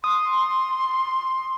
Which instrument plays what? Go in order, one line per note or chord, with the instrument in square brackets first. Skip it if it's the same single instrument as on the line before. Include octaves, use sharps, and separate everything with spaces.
[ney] C6 [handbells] D#6